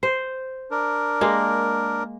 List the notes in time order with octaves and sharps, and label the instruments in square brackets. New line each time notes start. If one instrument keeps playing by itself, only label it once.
[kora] C5
[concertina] D4 A#4
[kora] G#3 A#3